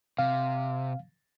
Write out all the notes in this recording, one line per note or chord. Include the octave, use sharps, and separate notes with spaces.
C3 F5